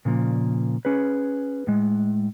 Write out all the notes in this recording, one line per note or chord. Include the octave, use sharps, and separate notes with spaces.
A#2 C#3 F3 A#3
C#4 G#4 B4
A2 G#3